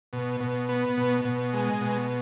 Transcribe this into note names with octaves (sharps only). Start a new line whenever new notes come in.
B2
B2
B3
B2
B2
G#3
B2